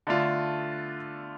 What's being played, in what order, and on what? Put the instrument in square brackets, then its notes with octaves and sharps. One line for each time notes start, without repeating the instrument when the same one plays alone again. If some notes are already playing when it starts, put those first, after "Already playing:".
[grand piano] D3 A3 D4 F4